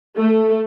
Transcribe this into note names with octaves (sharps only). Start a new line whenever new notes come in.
A3